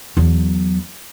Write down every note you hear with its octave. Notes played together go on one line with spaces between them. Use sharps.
E2 F#3